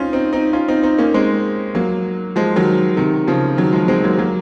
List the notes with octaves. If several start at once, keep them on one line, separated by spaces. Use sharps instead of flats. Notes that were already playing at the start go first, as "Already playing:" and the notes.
Already playing: C4 C#4 D#4 F4
C4 D#4
C4 D#4
C#4 F4
C4 D#4
C4 D#4
A#3 C#4
G#3 C4
F#3 A#3
F3 G#3
D#3 F#3
C3 D#3
C#3 F3
D#3 F#3
F3 G#3
G#3 C4
F#3 A#3
F#3 A#3